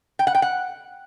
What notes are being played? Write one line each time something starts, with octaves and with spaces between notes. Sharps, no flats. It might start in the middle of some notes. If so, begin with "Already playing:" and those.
G5
F#5
G5
F#5